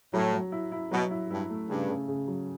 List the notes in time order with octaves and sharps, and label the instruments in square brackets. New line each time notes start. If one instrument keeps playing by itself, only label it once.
[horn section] A2 [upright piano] F#3
[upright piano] F#3
E4
E4
[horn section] B2 [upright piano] F#3
[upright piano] E4
[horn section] G2 [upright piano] E4
[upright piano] A3
[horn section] G2 [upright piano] C#3
[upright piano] C#3
C#3
F#3